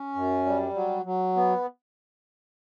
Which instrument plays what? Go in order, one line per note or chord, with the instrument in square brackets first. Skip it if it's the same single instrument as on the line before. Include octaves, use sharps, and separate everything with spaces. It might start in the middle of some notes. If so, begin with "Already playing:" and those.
Already playing: [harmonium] C#4
F#2
G3
F#3
F#3
B3